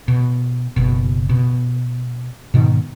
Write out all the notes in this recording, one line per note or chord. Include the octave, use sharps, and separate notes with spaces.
B2
F#1 B2
B2
G#2 B2 D#3